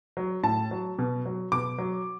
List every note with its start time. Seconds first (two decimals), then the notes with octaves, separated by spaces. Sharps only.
0.17 F#3
0.43 A2 A5
0.71 F#3
0.99 B2
1.26 F#3
1.52 B2 D6
1.78 F#3